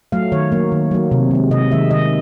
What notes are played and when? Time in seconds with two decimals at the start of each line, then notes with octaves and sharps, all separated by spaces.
0.12 F#3 A3 F5
0.32 D#3 C#5
0.52 F#3 A#3
0.72 D#3
0.91 F#3 A#3
1.11 C3
1.31 D#3 G#3
1.51 C3 D#5
1.71 D#3 G#3 E5
1.90 D#3 D#5